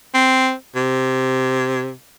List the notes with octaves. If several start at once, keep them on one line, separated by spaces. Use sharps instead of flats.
C4
C3